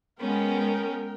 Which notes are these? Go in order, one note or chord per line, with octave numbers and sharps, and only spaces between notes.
G#3 B3 C#4 A#4 G5